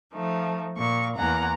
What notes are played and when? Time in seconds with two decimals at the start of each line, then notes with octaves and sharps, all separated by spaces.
0.12 F3 A3 D#4
0.76 A#2 C#6
1.16 E2 A#3 F#5 G#5 A#5